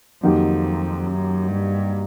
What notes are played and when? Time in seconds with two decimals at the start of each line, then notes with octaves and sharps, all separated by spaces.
0.23 F2 D#3 F#3 A#3 D#4 G4
1.06 F#2
1.48 G2